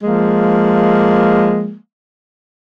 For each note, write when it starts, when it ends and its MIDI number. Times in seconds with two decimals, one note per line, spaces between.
0.02 1.75 53
0.02 1.75 56
0.02 1.75 58